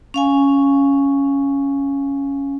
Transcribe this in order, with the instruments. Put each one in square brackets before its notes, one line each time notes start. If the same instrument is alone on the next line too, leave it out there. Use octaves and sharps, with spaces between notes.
[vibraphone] C#4 F5 G#5